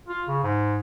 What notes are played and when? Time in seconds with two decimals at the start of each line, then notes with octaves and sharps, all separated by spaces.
0.08 F4
0.28 C#3
0.43 G#2